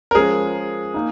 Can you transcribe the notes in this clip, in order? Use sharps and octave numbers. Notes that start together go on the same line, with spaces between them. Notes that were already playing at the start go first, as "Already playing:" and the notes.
A#4
F3 G#3 C#4 G#4
A#3 D#4